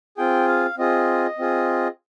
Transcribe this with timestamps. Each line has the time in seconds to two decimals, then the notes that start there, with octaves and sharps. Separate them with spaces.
0.17 C4 F4 G#4 G5
0.48 F5
0.78 C4 F4 G#4 D#5
1.39 C4 F4 G#4